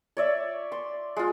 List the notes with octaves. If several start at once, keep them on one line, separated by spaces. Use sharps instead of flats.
C#5 D5 E5
C6
G#3 F4